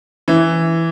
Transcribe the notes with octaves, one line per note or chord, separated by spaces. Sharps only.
E3